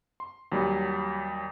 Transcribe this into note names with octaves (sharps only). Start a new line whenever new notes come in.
C6
D#2 F#3 G3